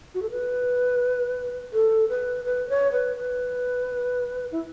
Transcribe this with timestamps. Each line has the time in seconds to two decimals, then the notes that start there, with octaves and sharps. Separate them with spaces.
0.14 F#4
0.22 A4
0.31 B4
1.73 A4
2.09 B4
2.45 B4
2.69 C#5
2.92 B4
3.17 B4
4.52 E4